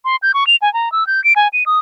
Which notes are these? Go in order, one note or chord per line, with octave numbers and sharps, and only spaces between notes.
C6
G6
C#6
F7
G#5
A#5
E6
G6
D7
G#5
D#7
D#6